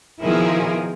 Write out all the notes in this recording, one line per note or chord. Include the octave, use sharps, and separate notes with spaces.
B2 D#3 F3 E4 G#4 A#4